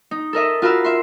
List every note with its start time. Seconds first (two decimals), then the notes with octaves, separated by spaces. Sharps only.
0.11 D#4
0.33 A4 A#4 D#5 E5
0.62 F4 F#4 A#4 F5 B5 E6
0.84 E5 C6